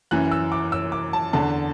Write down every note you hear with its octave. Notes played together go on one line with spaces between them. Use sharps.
F#2 E3 F#6
E6
D6
E6
D6
A5
E2 D3 A5